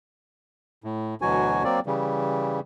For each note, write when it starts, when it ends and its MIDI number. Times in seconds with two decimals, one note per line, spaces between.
0.84 1.15 45
1.22 1.63 38
1.22 1.63 47
1.22 1.63 52
1.22 1.63 54
1.22 1.63 66
1.22 1.63 80
1.64 1.80 54
1.64 1.80 58
1.64 1.80 60
1.64 1.80 74
1.86 2.60 49
1.86 2.60 52
1.86 2.60 55